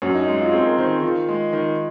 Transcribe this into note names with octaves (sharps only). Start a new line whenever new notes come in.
F#2 C#4
D#4
G#3
F4
C4 G#4
A#4
D#3 C5
G#4
D#3 F4
G#3
D#3